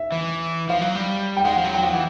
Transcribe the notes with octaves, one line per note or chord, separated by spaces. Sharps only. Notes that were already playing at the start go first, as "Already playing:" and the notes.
Already playing: E5
E3
F3 F5
F#3
G3
G5
G#3 F#5
F3
F#3
G5
F3 F#5
E3